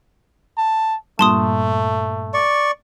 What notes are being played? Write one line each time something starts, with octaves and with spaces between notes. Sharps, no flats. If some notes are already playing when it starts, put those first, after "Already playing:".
A5
G2 A#2 A3 A5 C6 D#6
D5 C#6